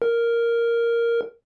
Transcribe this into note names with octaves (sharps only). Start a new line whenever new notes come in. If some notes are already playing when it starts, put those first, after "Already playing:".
A#4